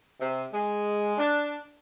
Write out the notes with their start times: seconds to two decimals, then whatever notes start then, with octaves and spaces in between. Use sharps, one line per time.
0.20 C3
0.52 G#3
1.18 D4